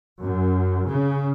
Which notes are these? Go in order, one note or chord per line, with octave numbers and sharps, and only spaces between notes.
F#2
C#3